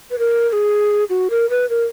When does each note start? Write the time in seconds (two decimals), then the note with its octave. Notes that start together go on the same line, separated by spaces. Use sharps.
0.11 B4
0.19 A#4
0.49 A#4
0.53 G#4
1.10 F#4
1.30 A#4
1.50 B4
1.70 A#4